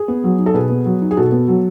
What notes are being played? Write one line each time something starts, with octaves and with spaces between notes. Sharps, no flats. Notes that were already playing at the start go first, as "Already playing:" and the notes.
Already playing: G#4
B3
F#3
D#4
A4
B2 G#4 B4
B3
F#3
D#4
G#4
B2 F#4 A4
B3
F#3